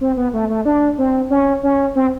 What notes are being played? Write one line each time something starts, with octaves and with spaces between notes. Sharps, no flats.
C4
B3
A3
A3
D4
C4
C#4
C#4
C4